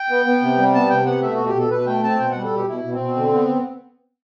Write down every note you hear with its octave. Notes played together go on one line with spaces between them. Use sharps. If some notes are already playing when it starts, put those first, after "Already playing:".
Already playing: G5
B3
B3
C3
G3
B3 A5
C3 G5
B3 F#5
A3 E5
B2 F#4
G4
B2 A4
B2 B4
A3 G5
C4 A5
B2 G5
G3 F#5
A4
B2 G4
B2 E4
B2
C4
B2
D3
B3